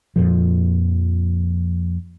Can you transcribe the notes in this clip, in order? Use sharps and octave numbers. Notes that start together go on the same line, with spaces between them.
F2 A#2 F3